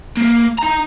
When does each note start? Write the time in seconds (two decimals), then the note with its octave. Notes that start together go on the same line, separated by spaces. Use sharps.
0.17 A#3
0.58 D#4 A#5